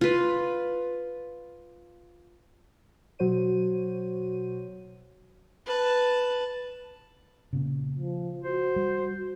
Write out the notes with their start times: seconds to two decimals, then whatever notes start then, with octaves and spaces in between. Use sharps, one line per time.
0.01 F4 B4
3.19 B2 F#3 F#4 C5 C#5 D#7
5.66 B4 A5
7.53 A#2 C#3
7.97 F3
8.43 F#4 C5
8.76 G3